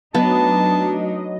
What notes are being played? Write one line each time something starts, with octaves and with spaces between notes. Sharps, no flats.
F#3 A3 B3 D4 D#4 D#5 A5